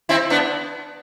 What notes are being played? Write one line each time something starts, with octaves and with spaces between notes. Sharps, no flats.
C4 E4
B3 D4